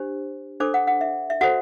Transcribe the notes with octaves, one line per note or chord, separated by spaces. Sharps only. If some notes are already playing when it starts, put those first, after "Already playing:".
Already playing: D4 G4 C5
D4 A4 C5 D6
F#5
F#5
E5
E5
F#4 A4 C5 F#5